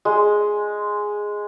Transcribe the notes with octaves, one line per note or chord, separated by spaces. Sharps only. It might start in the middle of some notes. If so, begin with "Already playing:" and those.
G#3